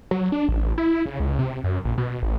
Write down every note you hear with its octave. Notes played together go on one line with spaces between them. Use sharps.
F#3
D4
A1
E4
C#3
C#2
C3
F#2
A#1
B2
A1